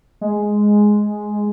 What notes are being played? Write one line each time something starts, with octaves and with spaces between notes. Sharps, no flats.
G#3